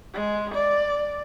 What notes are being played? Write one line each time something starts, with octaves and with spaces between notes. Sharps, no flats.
G#3
D5